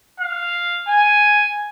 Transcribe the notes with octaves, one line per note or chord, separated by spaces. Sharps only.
F5
G#5